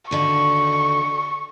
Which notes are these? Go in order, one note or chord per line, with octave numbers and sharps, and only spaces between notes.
D#2 D3 F#4 C#6